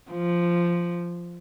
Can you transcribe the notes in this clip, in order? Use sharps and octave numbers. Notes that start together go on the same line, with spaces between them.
F3